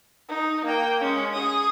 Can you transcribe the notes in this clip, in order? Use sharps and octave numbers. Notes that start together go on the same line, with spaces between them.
D#4
A#3 G5
G#3 C#4
G#4 D#6